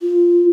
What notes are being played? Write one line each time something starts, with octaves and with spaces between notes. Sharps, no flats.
F4